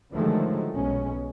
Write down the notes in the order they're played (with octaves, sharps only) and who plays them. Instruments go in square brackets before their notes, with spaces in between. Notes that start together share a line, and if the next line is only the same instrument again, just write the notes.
[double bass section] D3 D#3 F3 F#3 G#3 A3
B1 B2 G#3 C#4